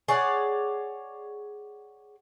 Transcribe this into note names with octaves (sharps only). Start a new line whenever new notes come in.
G#4 C#5 D5 F#5